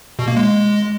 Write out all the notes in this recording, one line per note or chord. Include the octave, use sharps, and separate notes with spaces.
B2
A#3
G#3